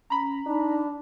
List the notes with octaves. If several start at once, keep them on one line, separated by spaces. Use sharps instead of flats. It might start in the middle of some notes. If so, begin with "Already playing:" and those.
C#4 A#5 B5
D4 D#4